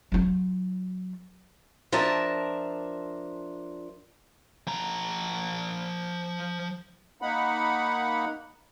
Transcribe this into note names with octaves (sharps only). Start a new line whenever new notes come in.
F#3 F4
F3 D4 A#4 E5 A5
F3 A#5
A#3 D#4 F#5 B5